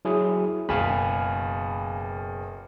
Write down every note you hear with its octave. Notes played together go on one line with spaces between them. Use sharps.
F#3 E4 G#4
F#1 B2 F5 G#5 B5